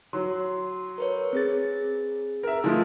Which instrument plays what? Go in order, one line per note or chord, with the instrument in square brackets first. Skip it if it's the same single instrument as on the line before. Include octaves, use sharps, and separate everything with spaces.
[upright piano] F#3 [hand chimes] C6
[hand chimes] A#4 B4 C#5
C4 G#4 A6
[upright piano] A#4 E5
F3 G#3 A3